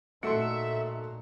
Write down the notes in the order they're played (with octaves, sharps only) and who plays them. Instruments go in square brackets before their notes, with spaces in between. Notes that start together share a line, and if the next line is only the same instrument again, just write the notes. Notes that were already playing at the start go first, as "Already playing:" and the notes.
[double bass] A#2 D#4 [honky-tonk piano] A3 C#7 [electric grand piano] F#4 A4 C6 [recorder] E5